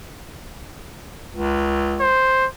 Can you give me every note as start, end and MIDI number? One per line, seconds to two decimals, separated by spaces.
1.32 2.10 37
2.01 2.47 72